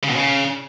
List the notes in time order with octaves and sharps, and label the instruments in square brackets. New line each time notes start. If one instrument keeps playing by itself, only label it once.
[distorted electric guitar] C#3
B2
C#3